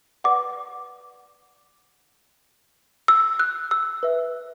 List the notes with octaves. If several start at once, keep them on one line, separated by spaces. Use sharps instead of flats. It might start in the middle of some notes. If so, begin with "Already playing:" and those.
B4 D5 F#5 D6
E6
F#6
E6
B4 E5